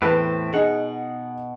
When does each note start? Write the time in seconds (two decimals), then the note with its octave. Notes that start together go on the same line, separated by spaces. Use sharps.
0.02 E2 A2 A3 C4 B4 A5
0.53 B2 D#4 G#4 F#5